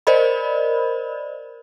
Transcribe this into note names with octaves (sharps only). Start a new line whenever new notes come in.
A#4 C5 D5 D#5 B5